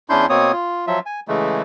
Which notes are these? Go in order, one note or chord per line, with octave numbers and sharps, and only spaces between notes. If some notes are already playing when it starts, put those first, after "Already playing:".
E2 C#4 D4 E4 C6 G6
B2 A#3 C4 C#5 D#6
F4
F3 F#3 F4 E5
G#5
C#3 E3 G#3 A3